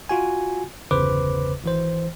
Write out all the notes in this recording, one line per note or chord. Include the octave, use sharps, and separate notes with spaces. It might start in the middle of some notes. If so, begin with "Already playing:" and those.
F4 F#4 G#5
G1 E2 C#3 B4 C5 D6
G#1 E3 C5